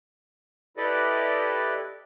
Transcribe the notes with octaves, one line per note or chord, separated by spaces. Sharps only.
E4 G4 A4 B4 D5 D#5